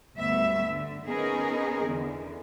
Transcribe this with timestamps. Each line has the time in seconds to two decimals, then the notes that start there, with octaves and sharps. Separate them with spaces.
0.18 D2 G2 B3 E5
0.66 D3
1.06 B3 C#4 D#4 G#4 A#4
1.86 E2 D3